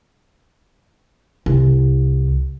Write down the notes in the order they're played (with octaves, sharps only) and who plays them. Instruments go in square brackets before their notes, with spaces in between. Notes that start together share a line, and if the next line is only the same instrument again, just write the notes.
[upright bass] C2